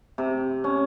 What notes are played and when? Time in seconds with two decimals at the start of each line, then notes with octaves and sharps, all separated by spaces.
0.18 C3
0.64 C#4